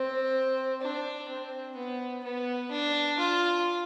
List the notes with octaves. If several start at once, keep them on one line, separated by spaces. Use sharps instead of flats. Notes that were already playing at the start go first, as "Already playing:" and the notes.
Already playing: C4
D4
C4
B3
B3
D4
F4